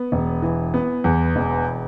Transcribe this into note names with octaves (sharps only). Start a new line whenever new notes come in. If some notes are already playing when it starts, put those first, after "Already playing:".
Already playing: B3
E1
E3
B3
E2
E1